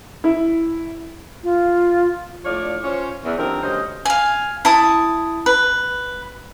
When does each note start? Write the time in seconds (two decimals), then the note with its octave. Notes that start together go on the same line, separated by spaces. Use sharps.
0.24 E4
1.44 F4
2.45 A2 F3 D4 C#5 D5 F5
2.84 C#4 F4 C5 C#5
3.25 E2
3.38 F2 D3 D#3 C4 G4 A#4
3.63 D2 G2 C#4 C5 D#5
4.05 F5 G#5
4.65 E4 A5 D#6
5.46 B4